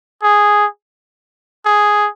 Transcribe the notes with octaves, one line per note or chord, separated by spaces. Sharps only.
G#4
G#4